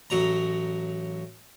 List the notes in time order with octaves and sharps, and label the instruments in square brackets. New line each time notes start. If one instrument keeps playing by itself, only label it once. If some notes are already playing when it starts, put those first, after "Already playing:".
[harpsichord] A1 F#3 A#5